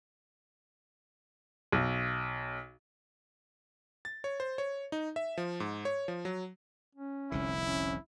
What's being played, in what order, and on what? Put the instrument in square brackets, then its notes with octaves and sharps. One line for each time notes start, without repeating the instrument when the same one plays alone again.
[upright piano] B1
[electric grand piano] A6
C#5
C5
C#5
D#4
E5
F3
G#2
C#5
F3
F#3
[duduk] C#4
[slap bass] F1 C2 D3 [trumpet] E4
[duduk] C#4